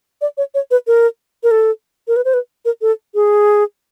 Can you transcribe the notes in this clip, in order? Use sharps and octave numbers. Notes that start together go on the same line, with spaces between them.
D5
C#5
C#5
B4
A#4
A#4
A4
A#4
B4
C5
B4
A#4
A4
G#4